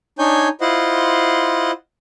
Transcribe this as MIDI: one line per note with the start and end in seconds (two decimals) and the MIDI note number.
0.19 0.48 62
0.19 0.48 63
0.19 0.48 73
0.19 0.48 80
0.19 0.48 91
0.61 1.71 64
0.61 1.71 65
0.61 1.71 72
0.61 1.71 75
0.61 1.71 78
0.61 1.71 84